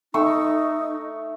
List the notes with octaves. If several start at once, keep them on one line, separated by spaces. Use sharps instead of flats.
A3 D#4 C#6 E6